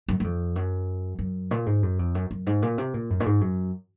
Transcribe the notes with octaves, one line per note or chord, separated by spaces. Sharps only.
F#2
F#2
F2
F#2
F#2
A#2
G#2
F#2
F2
F#2
F#2
G#2
A#2
C3
A#2
F#2
A#2
G#2
F#2